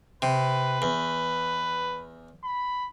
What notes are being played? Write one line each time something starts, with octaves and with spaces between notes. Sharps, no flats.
C3 B4
E2
B5